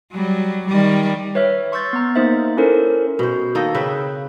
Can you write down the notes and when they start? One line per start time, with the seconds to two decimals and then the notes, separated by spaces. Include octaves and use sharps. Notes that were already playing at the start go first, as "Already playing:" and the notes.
0.12 F#3 G3
0.68 D#3 G3
1.35 B4 C#5 E5 F6
1.72 C6 C#6 E6 G6 A6
1.93 B3 A#5
2.15 A#3 D#4 C5 E5
2.57 C#4 E4 A4 A#4 C5
3.19 B2 C5
3.55 D#3 A#3 A4 D#5
3.75 C#3 C4 B4 E5